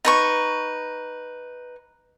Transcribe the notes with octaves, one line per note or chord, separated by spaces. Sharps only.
D#4 B4 C#6